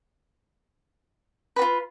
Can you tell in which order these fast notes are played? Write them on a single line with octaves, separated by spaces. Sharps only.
B4 F#4 F4